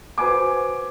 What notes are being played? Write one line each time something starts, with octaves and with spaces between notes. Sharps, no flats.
F#4 B4 C5 G#5 D6